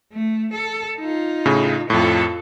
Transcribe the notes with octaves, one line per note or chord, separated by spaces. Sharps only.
A3
A4
D#4 F4
A2 C#3
F2 A2 F4 A4